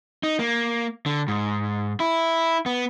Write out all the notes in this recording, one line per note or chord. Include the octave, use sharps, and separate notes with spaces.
D#4
A#3
D3
G#2
E4
B3